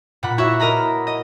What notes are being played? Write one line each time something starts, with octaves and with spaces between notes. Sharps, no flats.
A#2 F#5 B5
E4 F#4 C#5 E5
A#4 D#5 A#5 B5
D#5